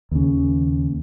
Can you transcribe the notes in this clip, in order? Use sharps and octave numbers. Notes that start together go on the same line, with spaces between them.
D#2 C#3